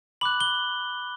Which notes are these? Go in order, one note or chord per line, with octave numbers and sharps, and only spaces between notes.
B5 D6 F#6 F#7
G7